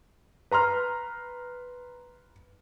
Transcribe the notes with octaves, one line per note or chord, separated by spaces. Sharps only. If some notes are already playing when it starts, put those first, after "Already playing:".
B4 A#5 C6 F6